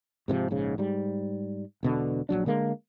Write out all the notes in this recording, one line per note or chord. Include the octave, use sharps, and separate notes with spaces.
G#2 C3 D#3 F3
A#1 G#2 C#3
G#2 G3
E1 B2 D3
A#1 F#2 F#3 D4
D3 G#3 A#3